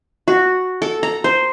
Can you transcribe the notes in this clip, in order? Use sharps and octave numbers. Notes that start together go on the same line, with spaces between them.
F#4
A4
A#5
C5